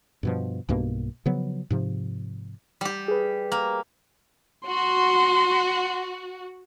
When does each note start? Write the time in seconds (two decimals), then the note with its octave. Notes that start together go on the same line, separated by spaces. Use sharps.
0.23 G2 B2 F3
0.69 B1 G2 B2 A#3
1.26 C#3 F3 F#3 B3
1.70 G#2 C3 F3
2.81 G3 G4
3.08 G#4 B4
3.52 A#3
4.67 F#4 C6